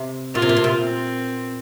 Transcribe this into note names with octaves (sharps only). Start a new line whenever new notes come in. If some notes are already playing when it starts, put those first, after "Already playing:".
Already playing: C3
A#2 F4
C3
A#2
C3
A#2
C4